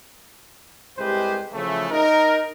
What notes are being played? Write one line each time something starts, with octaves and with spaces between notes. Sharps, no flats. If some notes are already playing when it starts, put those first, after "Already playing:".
C2 G#3 G4 B4 C5
C#3 E3 F3 A3
D#4 A#4